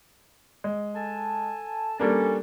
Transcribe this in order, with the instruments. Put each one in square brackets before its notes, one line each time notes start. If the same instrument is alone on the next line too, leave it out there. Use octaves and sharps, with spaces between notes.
[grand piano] G#3
[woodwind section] A4 G#5 A5
[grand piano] G3 A#3 D4 [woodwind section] C#4 A4